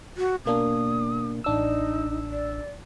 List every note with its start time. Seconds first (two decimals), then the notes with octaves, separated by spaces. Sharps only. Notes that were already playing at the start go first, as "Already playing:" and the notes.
0.17 F#4
0.46 B2 A#3 D4 D#6
1.44 A1 D4 D#4 E6
2.30 D5